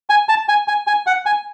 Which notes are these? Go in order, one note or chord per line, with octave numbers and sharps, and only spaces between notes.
G#5
A5
G#5
G#5
G#5
F#5
G#5